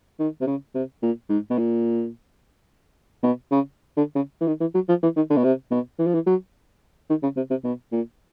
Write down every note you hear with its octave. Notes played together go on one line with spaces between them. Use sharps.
D#3
C3
C#3
C3
A#2
G#2
B2
A#2
B2
C#3
D3
C#3
E3
D#3
E3
F#3
F3
E3
D#3
D3
B2
C3
B2
E3
F3
E3
F#3
D#3
C#3
C3
C3
B2
A#2